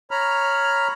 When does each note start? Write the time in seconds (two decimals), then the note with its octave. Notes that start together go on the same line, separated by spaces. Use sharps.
0.11 C#5 A#5 B5 F6